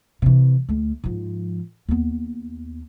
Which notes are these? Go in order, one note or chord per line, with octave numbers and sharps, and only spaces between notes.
C3 E3
D2 A3
G#2 F3
D#2 B3